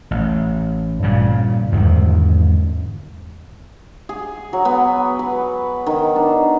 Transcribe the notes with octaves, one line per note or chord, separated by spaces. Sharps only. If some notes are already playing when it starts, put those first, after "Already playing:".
A1
G2 A#2 C#3
E2 G#2 D3 D#3
G#4
F#3
B3
B4
D#3
D4